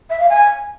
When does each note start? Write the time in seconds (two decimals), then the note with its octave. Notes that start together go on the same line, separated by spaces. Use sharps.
0.10 E5
0.19 F5
0.29 G#5